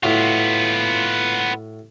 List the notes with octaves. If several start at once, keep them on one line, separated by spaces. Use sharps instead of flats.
A2 B3 F4 F#4